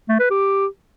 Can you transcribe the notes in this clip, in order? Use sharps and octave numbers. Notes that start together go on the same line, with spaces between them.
A3
B4
G4